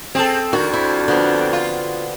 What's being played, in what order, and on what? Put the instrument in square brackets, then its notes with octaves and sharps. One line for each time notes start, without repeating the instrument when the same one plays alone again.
[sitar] C4 A4 [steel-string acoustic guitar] G#4
[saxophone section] F2 D4 [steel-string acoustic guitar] D#3 [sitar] F#4
[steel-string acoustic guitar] E4 C5
D3 B3 C4
[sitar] F4